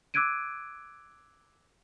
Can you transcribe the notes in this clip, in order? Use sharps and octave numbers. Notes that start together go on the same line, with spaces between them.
D6 E6 F#6 G#6 D7 D#7